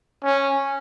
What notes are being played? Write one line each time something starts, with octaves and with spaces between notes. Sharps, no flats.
C#4